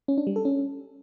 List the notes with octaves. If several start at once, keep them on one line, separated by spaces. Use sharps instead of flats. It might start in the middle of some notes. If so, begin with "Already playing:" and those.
C#4
D4
G3
A4
C#4